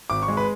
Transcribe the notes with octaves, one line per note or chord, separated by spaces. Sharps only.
G#1 D6
C#6
G#3
B4